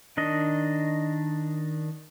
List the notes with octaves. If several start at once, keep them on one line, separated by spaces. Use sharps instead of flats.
D#3 D4 D#5